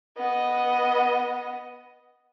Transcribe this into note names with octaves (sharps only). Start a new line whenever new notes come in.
B3 D#5